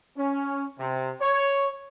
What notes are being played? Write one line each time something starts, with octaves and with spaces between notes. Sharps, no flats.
C#4
C3
C#5